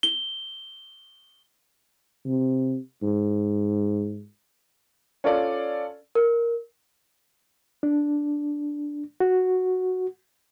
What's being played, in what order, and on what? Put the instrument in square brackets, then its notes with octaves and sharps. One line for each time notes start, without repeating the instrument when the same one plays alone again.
[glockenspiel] G7
[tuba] C3
G#2
[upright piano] C#4 F4 A4 D5
[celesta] A#4
[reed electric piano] D4
F#4